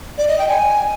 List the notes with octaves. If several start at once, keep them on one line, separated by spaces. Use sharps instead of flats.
D5
D#5
G5
G#5